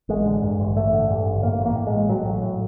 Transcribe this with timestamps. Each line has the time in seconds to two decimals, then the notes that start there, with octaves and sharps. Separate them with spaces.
0.09 A1 G#3
0.26 D3
0.43 G2
0.60 A1
0.76 A1 A3
0.93 D3
1.10 G2
1.26 A1
1.42 A2 A#3
1.60 A1
1.66 A#3
1.76 A2
1.87 G#3
1.93 A1
2.09 A2 F#3
2.26 A1
2.43 A2